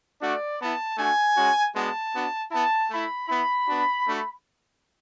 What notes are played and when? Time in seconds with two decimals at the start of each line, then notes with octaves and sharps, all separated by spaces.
0.21 A3 D4 F#4 D5
0.60 B3 E4 A5
0.97 A3 D4 F#4 G#5
1.36 G#3 C#4 F#4
1.75 G#3 B3 D4 F#4 A5
2.13 B3 D4 F#4
2.51 B3 E4 A5
2.90 A3 E4 B5
3.28 B3 E4 B5
3.67 B3 D4 F#4
4.06 A3 D4 F#4